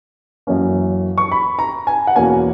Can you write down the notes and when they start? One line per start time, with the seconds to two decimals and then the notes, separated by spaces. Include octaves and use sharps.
0.47 F#2 E3 A#3 C#4
1.18 C#6
1.32 B5
1.59 A#5
1.87 G#5
2.07 F#5
2.15 E2 B2 A#3 C#4 G#5